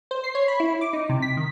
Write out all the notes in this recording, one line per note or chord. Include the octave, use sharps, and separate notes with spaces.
C5
C7
C#5
B5
E4
D6
D#4
C3
B6
D#3